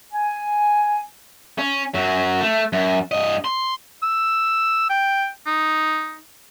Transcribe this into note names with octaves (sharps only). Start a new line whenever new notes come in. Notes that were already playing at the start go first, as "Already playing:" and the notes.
G#5
C#4
F#2 F#3
A3
F#2
G2 D#5
C6
E6
G5
D#4